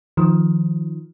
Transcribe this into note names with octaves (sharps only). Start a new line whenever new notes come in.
D#3 F3